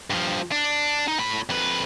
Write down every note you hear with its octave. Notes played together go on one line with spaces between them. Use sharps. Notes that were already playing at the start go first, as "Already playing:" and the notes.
G2 F3
D4
D#4
A2 B5
F2 B4